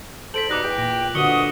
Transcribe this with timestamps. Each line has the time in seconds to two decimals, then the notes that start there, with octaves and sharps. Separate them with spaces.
0.34 A4 C5 B6 D7 F#7
0.49 B2 G3 D#4 D6 F#6 A#6
0.64 E2 G5
0.78 A#2 A#6
1.15 C2 B2 D3 F#4 C#6 D#6 C#7 G7